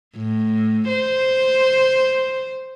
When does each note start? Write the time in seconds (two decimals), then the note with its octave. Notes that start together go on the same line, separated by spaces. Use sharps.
0.17 A2
0.88 C5